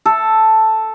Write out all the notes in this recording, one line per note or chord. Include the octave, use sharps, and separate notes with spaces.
A4